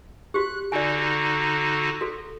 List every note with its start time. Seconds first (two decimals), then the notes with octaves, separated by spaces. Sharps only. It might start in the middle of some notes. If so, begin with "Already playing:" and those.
0.34 F#4 G4 F#6
0.72 D3 D#4 F#4 D5 G#5
2.01 F#4 A4